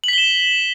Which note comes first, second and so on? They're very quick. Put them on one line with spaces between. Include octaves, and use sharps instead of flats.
F#7 B6 G7 E7